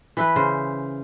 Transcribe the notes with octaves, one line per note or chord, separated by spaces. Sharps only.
E3 E4 B4
C#3 C5